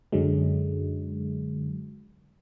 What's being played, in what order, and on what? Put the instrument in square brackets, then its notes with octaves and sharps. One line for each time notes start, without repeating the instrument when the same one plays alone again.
[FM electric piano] F#2 D3 F#3 G#3